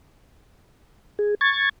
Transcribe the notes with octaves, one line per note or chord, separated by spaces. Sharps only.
G#4
C#6 G#6 A6